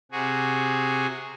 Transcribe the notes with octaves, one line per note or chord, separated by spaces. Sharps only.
C3 F#4 G#4